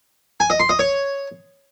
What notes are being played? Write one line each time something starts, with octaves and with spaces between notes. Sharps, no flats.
G#5
D#5
C6
D#5
C#5